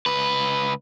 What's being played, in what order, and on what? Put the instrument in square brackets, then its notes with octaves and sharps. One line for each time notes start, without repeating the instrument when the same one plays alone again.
[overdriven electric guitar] C#2 B4